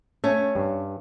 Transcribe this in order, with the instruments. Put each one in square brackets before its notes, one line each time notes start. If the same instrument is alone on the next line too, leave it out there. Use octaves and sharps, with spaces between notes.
[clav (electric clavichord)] A3 [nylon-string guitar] C#4
[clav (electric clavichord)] G2